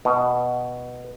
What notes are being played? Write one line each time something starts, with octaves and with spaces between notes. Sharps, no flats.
B2